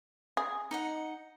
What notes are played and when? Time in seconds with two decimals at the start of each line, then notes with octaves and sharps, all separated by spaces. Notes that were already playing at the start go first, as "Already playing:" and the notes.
0.37 G#4
0.71 D#4 D#5 F#5